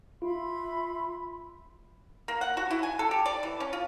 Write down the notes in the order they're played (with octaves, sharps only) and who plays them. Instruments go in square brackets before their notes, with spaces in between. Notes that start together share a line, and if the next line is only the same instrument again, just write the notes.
[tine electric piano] F4 [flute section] E5 B5 C6
[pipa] A#3
F#5
F#4
E4
G#5
A4
G4
D5
E3
C#4
F4